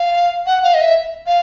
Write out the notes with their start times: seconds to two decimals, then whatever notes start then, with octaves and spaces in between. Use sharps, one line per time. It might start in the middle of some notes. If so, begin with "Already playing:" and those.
Already playing: F5
0.46 F#5
0.63 F5
0.74 D#5
0.81 E5
1.27 F5